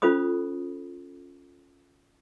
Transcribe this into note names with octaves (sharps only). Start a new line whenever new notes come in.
C#4 F4 A4 C5 B5 D#6